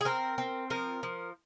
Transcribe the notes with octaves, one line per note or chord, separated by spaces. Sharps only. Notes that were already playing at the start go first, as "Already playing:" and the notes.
G#4
C4 A#4
C4
F3 A#4
F3